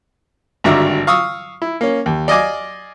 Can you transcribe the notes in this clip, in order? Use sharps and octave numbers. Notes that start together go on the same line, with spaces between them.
G#1 G2 D3 F#4 E5 A#5
F5 C#6 D#6 E6
E4
A#3 C#4
D#2
D5 D#5 F5 G#5 D6